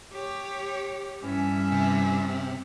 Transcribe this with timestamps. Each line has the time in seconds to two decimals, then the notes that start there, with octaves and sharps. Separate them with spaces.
0.12 G4 C#5
1.23 G2 E3 C#4 E5
1.72 C3